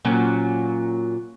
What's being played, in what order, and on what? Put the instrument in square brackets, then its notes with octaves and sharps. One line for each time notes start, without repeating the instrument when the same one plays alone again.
[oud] A#2 F#3 C#4